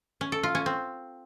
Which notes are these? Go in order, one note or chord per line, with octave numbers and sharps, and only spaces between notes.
C#4
A4
F4
C#4
C4